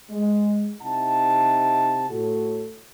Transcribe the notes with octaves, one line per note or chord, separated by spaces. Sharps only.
G#3
C3 D#4 E4 F#5 A5
A2 F#4 A4